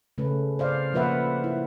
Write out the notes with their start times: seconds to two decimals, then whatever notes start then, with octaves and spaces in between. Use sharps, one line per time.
0.18 C#3 A3 C#4 B4
0.59 C5 D5 F5
0.93 F3 A#3 F4 B4 E5 F#5
1.44 E4